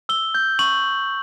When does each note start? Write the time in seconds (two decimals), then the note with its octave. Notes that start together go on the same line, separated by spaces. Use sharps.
0.09 E6 G7
0.35 G6
0.59 C#6 F#7